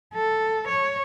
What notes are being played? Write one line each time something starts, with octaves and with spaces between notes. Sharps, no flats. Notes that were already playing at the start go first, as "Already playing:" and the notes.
A4
C#5